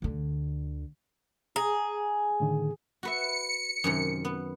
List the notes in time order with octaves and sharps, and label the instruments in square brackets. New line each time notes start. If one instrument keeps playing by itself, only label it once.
[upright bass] D2 D3
[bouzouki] G#4 [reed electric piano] A#5
[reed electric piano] A2 D3 D#3
[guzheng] F#4 B4 E5 [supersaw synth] C#7
[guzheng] F#2 C3 D#3
B3